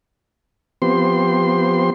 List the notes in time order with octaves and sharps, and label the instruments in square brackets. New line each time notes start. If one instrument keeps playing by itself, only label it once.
[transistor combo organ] F3 B3 C4 G4 C6